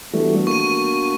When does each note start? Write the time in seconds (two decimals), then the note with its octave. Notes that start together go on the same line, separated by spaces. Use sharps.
0.13 E3 G3 A3 B3 D4 F#4
0.47 A#3 C#6 D#7